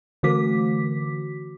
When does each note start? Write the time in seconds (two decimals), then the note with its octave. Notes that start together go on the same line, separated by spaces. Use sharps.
0.23 D3 E3 A3 F#4 D6 B6